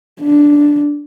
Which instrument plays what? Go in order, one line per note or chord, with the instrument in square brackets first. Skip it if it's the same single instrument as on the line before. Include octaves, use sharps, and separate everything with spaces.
[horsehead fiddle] D4